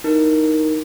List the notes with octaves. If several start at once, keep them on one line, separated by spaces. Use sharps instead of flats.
D#4 E4 A#4